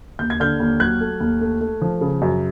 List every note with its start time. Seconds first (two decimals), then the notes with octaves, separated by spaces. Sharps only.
0.19 D#2 G6
0.30 G#6
0.40 D3 F6 G6
0.60 D#2
0.80 F#3 F#6 G#6
1.01 A3
1.20 D#2
1.41 A3
1.61 A3
1.81 F3
2.01 C#3
2.22 F#2